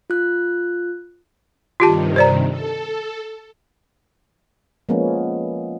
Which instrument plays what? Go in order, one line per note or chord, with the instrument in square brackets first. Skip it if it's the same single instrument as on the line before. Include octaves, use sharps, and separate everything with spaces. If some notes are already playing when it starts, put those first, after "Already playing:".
[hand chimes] F4 F#6
[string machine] G2 C3 D#3 [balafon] F4 G4 A5
[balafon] C5 D5 A#5
[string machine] A4
[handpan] F3 G#3 A#3 B3 C#4